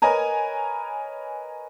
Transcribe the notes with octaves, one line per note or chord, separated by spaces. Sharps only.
A#4 B4 C#5 D#5 G#5 A#5